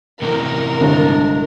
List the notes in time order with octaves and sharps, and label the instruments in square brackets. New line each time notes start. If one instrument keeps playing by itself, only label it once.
[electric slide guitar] A2 C3 E3 [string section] A#4
[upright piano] G1 [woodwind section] F3 G#3 D4